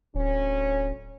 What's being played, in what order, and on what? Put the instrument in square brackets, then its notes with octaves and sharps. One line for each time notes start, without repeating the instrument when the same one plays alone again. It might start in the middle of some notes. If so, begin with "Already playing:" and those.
[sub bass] D1 [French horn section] D2 C#4